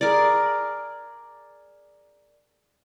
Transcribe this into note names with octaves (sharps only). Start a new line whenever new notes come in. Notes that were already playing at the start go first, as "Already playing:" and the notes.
G#4 A#4 D5